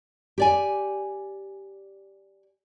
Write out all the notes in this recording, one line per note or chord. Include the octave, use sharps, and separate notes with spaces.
G4 D5 G#5